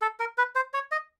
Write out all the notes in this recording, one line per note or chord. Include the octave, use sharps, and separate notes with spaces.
A4
A#4
B4
C5
C#5
D#5